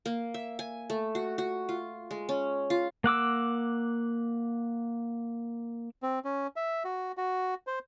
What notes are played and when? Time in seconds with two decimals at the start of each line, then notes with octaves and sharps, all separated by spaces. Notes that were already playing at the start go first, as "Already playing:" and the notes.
0.06 A#3
0.34 E5
0.59 G#5
0.90 A3
1.15 F#4
1.38 F#4
1.69 F4
2.11 G#3
2.29 C#4
2.70 F4
3.04 A#3 F#5 D6 E6
6.03 C4
6.25 C#4
6.56 E5
6.85 F#4
7.17 F#4
7.67 C5